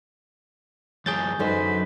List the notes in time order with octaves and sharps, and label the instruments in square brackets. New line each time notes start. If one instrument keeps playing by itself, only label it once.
[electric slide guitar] F#2 E3 C#5 [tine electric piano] G#4 G6 A6
[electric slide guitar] F#2 [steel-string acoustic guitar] D3 D#4 C5 [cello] F#3 B4